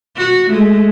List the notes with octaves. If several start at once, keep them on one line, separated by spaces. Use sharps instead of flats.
F#4
G#3 A3